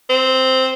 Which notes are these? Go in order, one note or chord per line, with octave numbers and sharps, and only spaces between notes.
C4